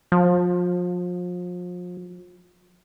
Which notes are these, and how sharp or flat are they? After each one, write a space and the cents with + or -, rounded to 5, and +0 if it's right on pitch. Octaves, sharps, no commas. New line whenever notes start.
F3 +35